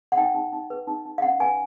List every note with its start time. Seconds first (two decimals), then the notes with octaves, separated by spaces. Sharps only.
0.12 F#5
0.17 D#4 G5
0.34 D#4
0.53 D#4
0.70 B4
0.87 D#4
1.06 D#4
1.18 F5
1.22 C#4 F#5
1.40 B4 G#5